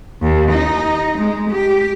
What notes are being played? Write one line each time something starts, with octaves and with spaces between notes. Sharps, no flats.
D#2
D#4
G#3
G4